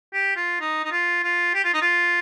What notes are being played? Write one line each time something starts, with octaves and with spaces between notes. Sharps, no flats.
G4
F4
D#4
D#4
F4
F4
G4
F4
D#4
F4